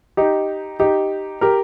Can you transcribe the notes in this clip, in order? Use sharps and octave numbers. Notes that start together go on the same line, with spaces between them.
D#4 G4
D#4 G4
G4 A#4